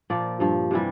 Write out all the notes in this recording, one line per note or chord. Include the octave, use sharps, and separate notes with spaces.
A#2 F3 D5
G2 F3
C3 E3 G3